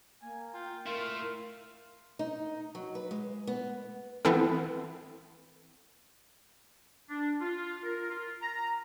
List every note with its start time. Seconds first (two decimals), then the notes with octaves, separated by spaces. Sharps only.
0.22 A#3 G#5
0.54 F4 G5
0.86 A3 E4 A#4 F5 C6
2.19 D#4
2.75 F#3
2.95 B4
3.11 G#3
3.47 B3
4.25 E3 B3 C4 A4
7.09 D4
7.41 F4
7.83 A#4
8.09 F4
8.41 A#5